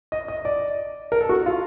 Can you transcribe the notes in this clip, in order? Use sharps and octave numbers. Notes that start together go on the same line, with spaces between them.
D#5
D#5
D5
A#4
A4
F#4
F4